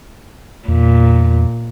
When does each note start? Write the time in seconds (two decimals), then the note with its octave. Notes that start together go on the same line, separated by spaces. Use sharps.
0.68 E2 A#2